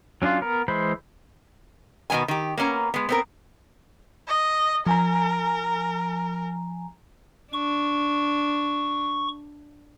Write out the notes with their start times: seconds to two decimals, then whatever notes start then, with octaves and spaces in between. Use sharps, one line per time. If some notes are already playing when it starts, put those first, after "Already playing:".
0.22 F#3 C#4 D4 F4
0.41 B3 A#4
0.68 E3 G#3 C5 B5
2.10 B2 D#3 A#3 B3 G#5
2.28 D#3 G4
2.58 A#3 B3 C#4 A#5
2.94 G#3 B3
3.09 B3 C4 A#4
4.28 D#5
4.87 F3 A#4 G#5 A#5
7.53 D4 C#6